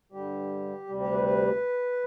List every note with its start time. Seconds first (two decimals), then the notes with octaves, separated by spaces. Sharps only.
0.12 G2 D3 G3 G4
0.87 D2 C3 G3
1.00 G4
1.12 B4
1.25 B4